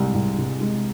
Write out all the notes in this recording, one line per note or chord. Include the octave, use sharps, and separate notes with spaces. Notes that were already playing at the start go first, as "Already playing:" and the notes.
Already playing: C2 G#3
C2
C2
G#3